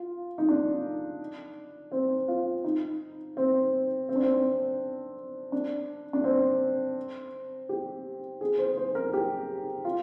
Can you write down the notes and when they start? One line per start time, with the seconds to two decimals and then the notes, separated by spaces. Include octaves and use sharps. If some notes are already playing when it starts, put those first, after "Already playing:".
Already playing: F4
0.38 D#4
0.49 D4
1.92 C4
2.28 F4
2.64 D#4
3.37 C4
4.09 C4
4.16 D4
4.23 C4
5.52 D4
6.13 D4
6.24 C4
7.69 G4
8.41 G#4
8.58 C5
8.77 C5
8.95 A#4
9.14 G4
9.85 F4